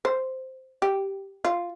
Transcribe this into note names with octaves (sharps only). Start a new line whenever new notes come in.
C5
G4
F4